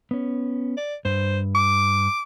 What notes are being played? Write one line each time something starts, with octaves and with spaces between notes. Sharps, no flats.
B3 C#4
D5
G2 C5
D6